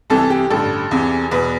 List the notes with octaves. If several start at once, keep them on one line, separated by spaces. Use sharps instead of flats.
C2 C3 E3 A4
G4
A1 G2 D3 A4
E2 C3 E3
E2 B2 B4